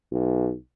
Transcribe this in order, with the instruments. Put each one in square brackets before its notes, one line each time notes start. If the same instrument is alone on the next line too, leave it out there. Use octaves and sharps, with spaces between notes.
[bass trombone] B1